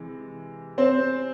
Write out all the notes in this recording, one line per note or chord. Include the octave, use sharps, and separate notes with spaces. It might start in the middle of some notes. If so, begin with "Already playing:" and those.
Already playing: C3 E3 G#3
C4 C5